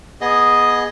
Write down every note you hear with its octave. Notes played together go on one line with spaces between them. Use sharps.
B3 G#4 D#5